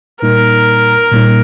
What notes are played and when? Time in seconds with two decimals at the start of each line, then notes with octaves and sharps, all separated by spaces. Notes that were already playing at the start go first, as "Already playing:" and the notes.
0.22 A#2 G3 A#3 D#4 A#4
1.12 A#2 G3 A#3 D#4